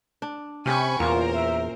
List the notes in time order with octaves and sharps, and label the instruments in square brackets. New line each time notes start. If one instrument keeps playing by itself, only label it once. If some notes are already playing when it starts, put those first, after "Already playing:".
[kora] D4
[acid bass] C3 [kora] C#4 G4 C#5 [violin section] G#5 B5 C#6
[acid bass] E2 [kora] A#2 [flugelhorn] F4 [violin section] A#4 C5
[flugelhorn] E5